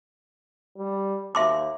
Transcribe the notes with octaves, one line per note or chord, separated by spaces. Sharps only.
G3
D#2 E5 C6 D6